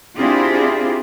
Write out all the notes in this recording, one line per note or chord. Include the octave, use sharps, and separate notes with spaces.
C4 D4 E4 F4 G4 G#4